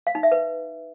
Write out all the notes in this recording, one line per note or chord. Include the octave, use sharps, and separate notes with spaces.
F5
D#4
E5
B4